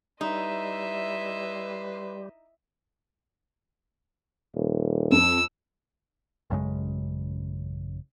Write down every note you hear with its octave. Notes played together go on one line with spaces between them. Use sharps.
G3 D#4 E4 B4 D#5 E5 C6
D#1
F2 E6
A1 F#2 C#3 G#3